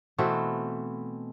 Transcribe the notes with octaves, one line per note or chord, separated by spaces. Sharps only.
B2 E3 A3 C4